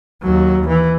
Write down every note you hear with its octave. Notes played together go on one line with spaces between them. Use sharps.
D#2 F#3
E3